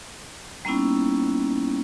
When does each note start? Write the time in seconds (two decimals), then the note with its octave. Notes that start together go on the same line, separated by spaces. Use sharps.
0.65 G3 A#3 B3 C#4 D#4 E4